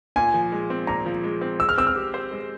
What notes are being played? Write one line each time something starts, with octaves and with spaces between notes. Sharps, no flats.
A#2 G#5
F3
G#3
C4
A#2 A#5
F3
G#3
C4
G#3 E6
F6
C4 E6
F6
G4
C5
G#3